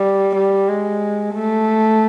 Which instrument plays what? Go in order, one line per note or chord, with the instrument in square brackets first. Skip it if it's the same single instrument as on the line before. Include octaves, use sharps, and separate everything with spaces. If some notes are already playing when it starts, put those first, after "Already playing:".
Already playing: [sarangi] G3
G3
G#3
A3